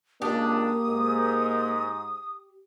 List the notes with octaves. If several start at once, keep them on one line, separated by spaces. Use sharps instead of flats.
C#2 A#3 D4 G4 D#6
G#2